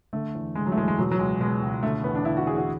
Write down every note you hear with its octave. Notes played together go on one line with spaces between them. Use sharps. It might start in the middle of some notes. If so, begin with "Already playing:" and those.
D3 A3
E2
D3 G#3
F#3
A3
E2 G#3
G#3
B2 F#3
F#3
C#2 G#3
B2 G#3
C#2
D3 A3
E2 B3
D4
D3 E4
F#4
E2 G#4
F#4